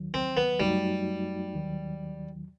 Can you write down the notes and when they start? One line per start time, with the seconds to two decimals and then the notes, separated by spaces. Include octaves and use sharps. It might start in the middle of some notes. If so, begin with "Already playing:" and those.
Already playing: D#2 D#3 F#3
0.14 C4
0.37 B3
0.60 F#2 F#3 G3 A3 D#4 F#4
1.54 D#2 D#3 F#3